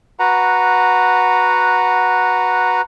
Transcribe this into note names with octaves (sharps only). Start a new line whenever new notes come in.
F#4 B4 F#5 A#5